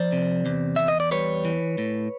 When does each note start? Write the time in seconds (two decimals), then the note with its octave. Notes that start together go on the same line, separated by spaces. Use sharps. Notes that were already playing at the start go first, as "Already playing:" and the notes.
Already playing: F3 C5 D5
0.12 C3
0.46 E2
0.76 E2 E5
0.88 D#5
1.00 D5
1.11 G3 B4 C#5
1.45 E3
1.78 A2